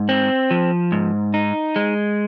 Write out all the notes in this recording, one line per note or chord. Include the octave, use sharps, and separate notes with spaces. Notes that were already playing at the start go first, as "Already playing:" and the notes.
Already playing: G#2
C4
F3
G#2
D#4
G#3